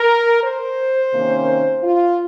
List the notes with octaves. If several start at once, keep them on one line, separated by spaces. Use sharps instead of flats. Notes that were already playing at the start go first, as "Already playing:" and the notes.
Already playing: A#4
C5
C3 D#3 A#3 C#4
F4